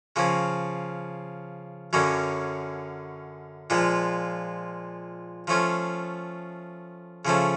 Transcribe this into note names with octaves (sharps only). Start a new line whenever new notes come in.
C#3 F3 A#3 C#4
F#2 D3 F#3 A#3 C#4
A#2 F3 G#3
F3 A3 C#4 F4
C#3 F3 A3 C#4